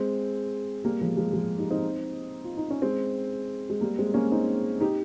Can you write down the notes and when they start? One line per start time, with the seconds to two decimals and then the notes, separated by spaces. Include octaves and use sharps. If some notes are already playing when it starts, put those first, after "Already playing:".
Already playing: G#3 C4
0.84 G3 A#3
1.01 F3 G#3
1.17 F3 G#3
1.33 F3 G#3
1.58 D#4 G4
1.71 C4 D#4
2.44 F4
2.57 D#4
2.70 C#4
2.82 G#3 C4
3.70 G#3
3.81 G3 A#3
3.98 G#3 C4
4.14 A#3 C#4
4.32 C4 D#4
4.81 D#4 G4